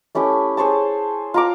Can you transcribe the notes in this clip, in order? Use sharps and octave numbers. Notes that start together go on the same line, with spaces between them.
A3 C#4 E4 G4
G#4 C5 C#5 A5
F4 A#5 D6